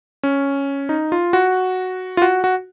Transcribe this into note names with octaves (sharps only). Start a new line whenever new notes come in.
C#4
D#4
F4
F#4
F4
F#4
F#4